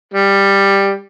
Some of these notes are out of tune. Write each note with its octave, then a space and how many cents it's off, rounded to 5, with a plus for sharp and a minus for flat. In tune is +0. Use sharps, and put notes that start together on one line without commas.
G3 +10